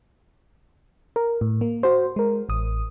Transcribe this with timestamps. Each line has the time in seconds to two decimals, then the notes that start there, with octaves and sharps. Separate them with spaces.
1.16 A#4
1.41 A2
1.61 A#3
1.83 F#4 C5
2.16 G#3 A#4
2.49 A1 D#6